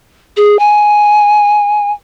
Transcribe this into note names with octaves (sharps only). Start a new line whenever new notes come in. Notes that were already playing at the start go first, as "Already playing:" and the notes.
G#4
G#5